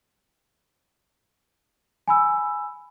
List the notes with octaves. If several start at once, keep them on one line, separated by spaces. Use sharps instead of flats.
G#5 B5 E6